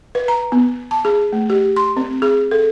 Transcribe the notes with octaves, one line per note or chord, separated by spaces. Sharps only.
B4
A#5
B3
A5
G#4
A3
G4
C6
C4
G#4
A4